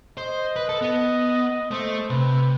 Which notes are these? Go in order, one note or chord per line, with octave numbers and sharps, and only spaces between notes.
C5 D#5
B4
A4
B3
A3 C5
C3 B4